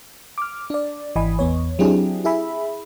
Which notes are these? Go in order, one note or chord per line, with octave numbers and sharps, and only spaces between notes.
D6 F6
D4 D5
G#1 E3 D#5 G#5 B5
E2 B3 C#5
F#3 C4 D4 E4 G4 G#4
E4 G#4 E5 B5